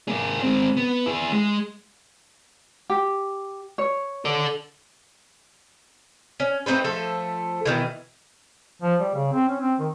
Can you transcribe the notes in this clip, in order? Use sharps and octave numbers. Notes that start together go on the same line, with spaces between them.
A#3 G#4
G#3 C4
B3
E4 G#4
G#3
G4
C#5
A4 D5
C#4
A3 C4 D#4 B4
F3 A3 A4 E5
B2 D#3 E3
F3
G3
C#3
C4
C#4
C4
D#3